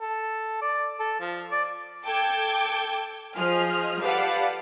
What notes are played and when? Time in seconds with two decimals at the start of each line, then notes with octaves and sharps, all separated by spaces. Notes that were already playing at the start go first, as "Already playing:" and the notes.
0.01 A4
0.62 D5
1.00 A4
1.20 F3
1.51 D5
2.05 A4 G5 D6 G6 G#6
3.37 F3 G#4 D#5 F6
4.01 G4 A4 B4 D5 F5 F#5